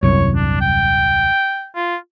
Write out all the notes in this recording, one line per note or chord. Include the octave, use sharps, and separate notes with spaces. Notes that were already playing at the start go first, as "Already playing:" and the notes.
D#1 C2 F#2 C#5
D4
G5
F4